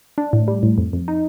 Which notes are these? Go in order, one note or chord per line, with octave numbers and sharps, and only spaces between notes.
D4
A2
G3
A2
F2
F2
D#4